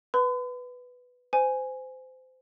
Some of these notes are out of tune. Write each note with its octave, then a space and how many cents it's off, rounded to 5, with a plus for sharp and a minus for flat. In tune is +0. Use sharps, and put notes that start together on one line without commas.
B4 +0 B5 +45
C5 -25 G#5 +0